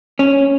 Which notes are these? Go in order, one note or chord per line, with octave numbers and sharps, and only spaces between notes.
C#4